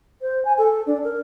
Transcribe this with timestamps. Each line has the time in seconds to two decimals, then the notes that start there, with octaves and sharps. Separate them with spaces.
0.22 C5
0.45 G#5
0.58 A4
0.87 D4
1.04 A#4